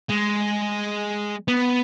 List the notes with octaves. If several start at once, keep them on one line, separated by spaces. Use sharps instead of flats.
G#3
B3